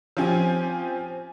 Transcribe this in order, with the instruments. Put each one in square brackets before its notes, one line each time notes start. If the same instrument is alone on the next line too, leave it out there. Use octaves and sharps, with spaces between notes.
[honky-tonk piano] F3 C4 C#4 G4 G#5